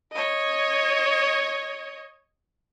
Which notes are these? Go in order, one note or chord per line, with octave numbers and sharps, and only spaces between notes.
C#5 D#5